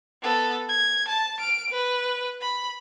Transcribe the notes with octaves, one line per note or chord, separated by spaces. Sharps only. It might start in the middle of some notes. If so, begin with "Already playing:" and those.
B3 A4
G#6
A5
F6 D7
B4
B5